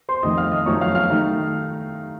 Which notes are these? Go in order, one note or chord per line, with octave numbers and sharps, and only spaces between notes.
C5 C6
F2 D#3 A3 D#5 D#6
F5 F6
D#5 D#6
F#2 F3 A3 D#4 C#5 C#6
F5 F6
F5 F6
D#3 A3 D#4